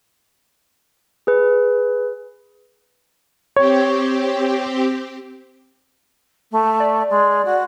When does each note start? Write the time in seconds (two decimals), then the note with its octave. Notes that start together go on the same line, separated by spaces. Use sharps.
1.27 G#4 B4
3.56 C4 G4 C#5
6.52 A3
6.80 D5
7.10 G#3
7.45 F#4